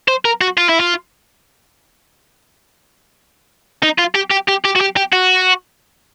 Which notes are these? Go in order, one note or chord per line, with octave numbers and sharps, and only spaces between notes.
C5
A#4
F#4
F4
E4
F4
D#4
F4
G4
G4
G4
G4
F#4
G4
G4
F#4